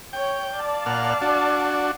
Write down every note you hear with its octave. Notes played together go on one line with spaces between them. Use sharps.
C#5 G5
D5 F5 A5
A#2 F#5 F6
D4 F#4